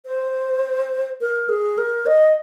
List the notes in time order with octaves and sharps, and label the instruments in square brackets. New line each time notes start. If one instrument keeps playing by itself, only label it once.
[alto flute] C5
A#4
G#4
A#4
D#5